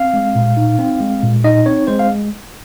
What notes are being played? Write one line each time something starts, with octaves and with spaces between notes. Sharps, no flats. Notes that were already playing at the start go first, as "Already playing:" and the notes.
Already playing: C4 F5
G#3
A#2
D#4
C4
G#3
A#2
D#4 D#5
C4 C#5
G#3 C5
F5